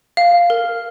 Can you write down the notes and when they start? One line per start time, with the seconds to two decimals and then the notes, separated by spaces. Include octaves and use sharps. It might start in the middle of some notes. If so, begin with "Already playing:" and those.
0.17 F5
0.50 A#4